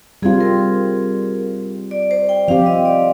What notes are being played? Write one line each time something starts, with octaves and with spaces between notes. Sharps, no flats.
G3 C4 F4 G#4
A#4
D5
C5
G5
F3 C4 G4 F5
D#5
D5